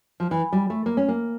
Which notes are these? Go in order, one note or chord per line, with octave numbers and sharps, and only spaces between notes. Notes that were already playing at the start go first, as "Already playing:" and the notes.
F3
E3
G3
A3
A#3
C#4
A#3